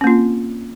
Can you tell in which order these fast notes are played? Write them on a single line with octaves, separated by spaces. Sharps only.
C#4 A#3 F4 C4